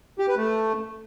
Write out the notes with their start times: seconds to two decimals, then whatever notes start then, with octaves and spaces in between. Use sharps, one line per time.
0.19 G4
0.28 B4
0.37 A3